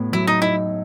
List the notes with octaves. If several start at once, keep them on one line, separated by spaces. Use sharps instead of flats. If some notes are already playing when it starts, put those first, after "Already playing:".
Already playing: A2 B3
F#3 E4
D#4
D#4 E4